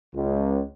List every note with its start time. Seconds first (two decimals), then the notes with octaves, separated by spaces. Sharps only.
0.14 C#2